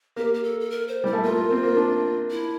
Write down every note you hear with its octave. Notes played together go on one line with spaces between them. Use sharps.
A#3 G4
G4
A4
A4
A#4
C5
G3 E4
A3
A#3 F4
A#3
C4
A#3
D4
E4